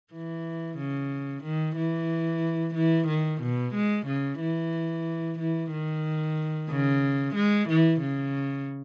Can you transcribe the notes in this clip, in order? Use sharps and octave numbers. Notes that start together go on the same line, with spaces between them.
E3
C#3
D#3
E3
E3
D#3
B2
G#3
C#3
E3
E3
D#3
C#3
G#3
E3
C#3